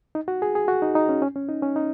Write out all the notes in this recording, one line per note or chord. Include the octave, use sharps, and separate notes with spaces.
D#4
F#4
G#4
G#4
F#4
D#4
D#4
C#4
C#4
C#4
D#4
C#4
D#4